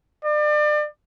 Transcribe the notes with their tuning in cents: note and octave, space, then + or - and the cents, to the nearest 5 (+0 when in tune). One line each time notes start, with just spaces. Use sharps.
D5 +35